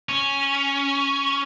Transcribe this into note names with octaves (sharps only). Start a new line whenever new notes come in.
C#4